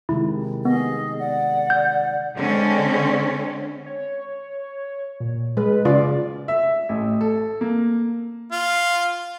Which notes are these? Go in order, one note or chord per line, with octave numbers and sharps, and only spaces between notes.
C3 D#3 G#3 E4
B3 G#4 D#5
D5 F#5
G6
D3 G#3 C4 C#4
C#5
A#2
G#3 B4
C#3 F4 D5
E5
A1
A4
A#3
F4